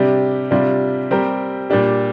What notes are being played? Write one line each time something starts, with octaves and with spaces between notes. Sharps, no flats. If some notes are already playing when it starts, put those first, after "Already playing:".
Already playing: C3 G3 D4 G4
C3 G3 D4 F4
G3 C4 G4 A#4
A#2 G3 D4 G4